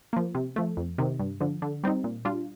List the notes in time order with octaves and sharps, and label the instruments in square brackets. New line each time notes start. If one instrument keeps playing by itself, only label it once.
[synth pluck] F3 A#3
C3
F3 A3
F2
C3 D#3
G2
D3 F3
D3
G3 C4 D#4
A#2
G3 D4 F4